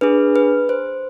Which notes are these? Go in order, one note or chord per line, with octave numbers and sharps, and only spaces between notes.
D4 G#4 B4
B4
C5